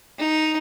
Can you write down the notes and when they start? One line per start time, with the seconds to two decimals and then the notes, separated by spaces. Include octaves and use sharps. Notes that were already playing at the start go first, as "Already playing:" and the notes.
0.18 D#4